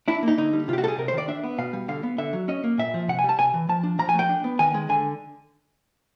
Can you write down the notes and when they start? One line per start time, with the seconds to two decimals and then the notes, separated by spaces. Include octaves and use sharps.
0.08 D4 E4
0.23 A#3 D#4
0.38 D3 D#4
0.53 G3
0.68 C3 F4
0.73 G4
0.78 F#4
0.83 G3 A4
0.88 G#4
0.98 C3 A#4
1.08 C5
1.13 D#3 D5
1.28 D4 E5
1.44 B3
1.58 B2 F5
1.73 G3
1.88 D3 F5
2.03 B3
2.18 D3 E5
2.33 F#3
2.48 C#4 D#5
2.64 A#3
2.78 A#2 E5
2.94 F3
3.08 C3 F#5
3.19 G#5
3.24 G3
3.29 A5
3.39 C3 G#5
3.54 E3
3.69 F3 A5
3.83 D4
3.99 F3 A#5
4.09 G#5
4.14 A3
4.19 G5
4.29 D4
4.44 B3
4.59 D#3 G#5
4.74 G#3
4.89 D3 G#5